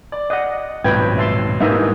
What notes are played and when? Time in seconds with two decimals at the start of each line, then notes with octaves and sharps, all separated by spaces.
0.12 D5
0.30 D#5 F#5
0.84 D#1 B1 G#2 F3 C4 B4 G5 G#6
1.18 E5 A5 C6
1.60 G#2 E3 G3 A#3 D#4 D#5 E5